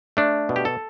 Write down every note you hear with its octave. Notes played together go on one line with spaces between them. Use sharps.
A3 D4
B2
G4
A4